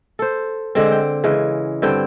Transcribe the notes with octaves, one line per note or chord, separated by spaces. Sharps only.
A4 C5
D3 G#3 C4
G5
C#3 E3 G#3
G2 D3 C4 G5